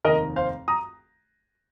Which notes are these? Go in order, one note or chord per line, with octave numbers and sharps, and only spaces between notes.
F1 D#2 D#3 A#4 D#5
C5 F5
A#5 D#6